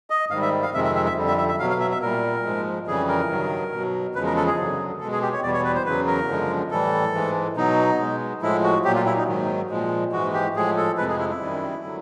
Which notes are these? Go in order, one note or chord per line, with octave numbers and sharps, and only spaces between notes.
D#5
G#2 D#3 G3 F5
E5
F5
F2 C3 D#3 G#3 E5
E5
E5
E5
F2 D3 G3
E5
E5
E5
B2 F#3 F5
F5
E5
E5
A#2 G3 A#4
G#2 F3 G#3
F2 C#3 E3 G3 G#4
A#4
G2 D#3 F#3
B2 F#3
E2 C#3 F3 G#3 B4
A#4
A4
G#4
F#2 D3 F#3
B2 G#3 A4
G#4
G4
C#5
E2 B2 G3 D5
C#5
B4
C5
E2 C#3 F#3 B4
A#4
F#2 D3 F3 G#3
A2 E3 G3 A4
G#2 E3 G#3
B2 F#3 D#4
B2 G#3
A2 F3 G#3 E4
F#4
A#2 F#3 G4
F4
E4
D#4
G#2 D#3 F#3
A#2 F3 G#3
G#2 E3 G#3 F#4
G4
A2 F3 G#3 G#4
A4
F2 C3 F3 G#3 B4
G#4
E4
E4
F#2 D#3 G3
D3 F#3